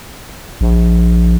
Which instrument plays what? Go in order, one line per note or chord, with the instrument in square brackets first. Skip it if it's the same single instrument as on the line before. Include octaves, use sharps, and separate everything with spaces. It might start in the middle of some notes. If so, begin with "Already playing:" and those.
[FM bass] A#1